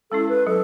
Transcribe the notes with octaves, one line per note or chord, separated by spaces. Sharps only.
G#3 C#4 E4 A4
B4
F#3 A4